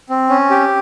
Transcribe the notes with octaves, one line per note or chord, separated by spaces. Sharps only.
C4
C#4
G4